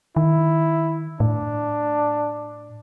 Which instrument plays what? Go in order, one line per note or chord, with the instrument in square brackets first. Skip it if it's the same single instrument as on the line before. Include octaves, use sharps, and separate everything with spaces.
[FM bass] D#3 [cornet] E4
[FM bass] A2 [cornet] D4